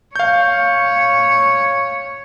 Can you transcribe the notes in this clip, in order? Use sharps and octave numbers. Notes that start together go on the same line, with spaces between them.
C#5 F5 G6